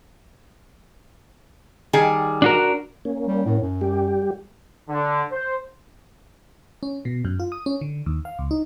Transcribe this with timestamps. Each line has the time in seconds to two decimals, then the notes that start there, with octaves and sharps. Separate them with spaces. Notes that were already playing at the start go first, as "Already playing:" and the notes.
1.93 D#3 G3 G#4
2.42 D4 F#4 A#4
3.05 A#3 C#4
3.27 G3
3.46 A2
3.61 F#2
3.81 G3 G4
4.89 D3
5.31 C5
6.83 C#4
7.05 B2
7.25 F#2
7.40 F4
7.52 D#6
7.66 C#4
7.81 D3
8.06 D#2
8.25 F5
8.39 C#2
8.51 D#4